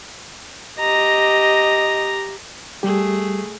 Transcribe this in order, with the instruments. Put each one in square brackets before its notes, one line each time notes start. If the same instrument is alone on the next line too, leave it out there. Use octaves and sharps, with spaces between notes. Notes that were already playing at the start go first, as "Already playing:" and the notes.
[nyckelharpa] G4 A#5 [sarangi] D#5
[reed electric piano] G3 G4 [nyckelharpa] A3 G#4